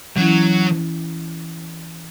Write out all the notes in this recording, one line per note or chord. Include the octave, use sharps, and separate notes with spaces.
E3 F#3 C#4 E4